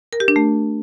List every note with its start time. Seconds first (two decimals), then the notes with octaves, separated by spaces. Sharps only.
0.13 A#4
0.20 G4
0.28 D4
0.36 A3